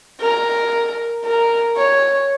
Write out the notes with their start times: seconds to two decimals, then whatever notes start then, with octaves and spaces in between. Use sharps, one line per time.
0.21 A#4
1.24 A#4
1.77 C#5